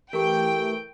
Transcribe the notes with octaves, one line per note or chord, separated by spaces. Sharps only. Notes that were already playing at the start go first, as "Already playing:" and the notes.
E3 A3 G4 A#4 G5 C#6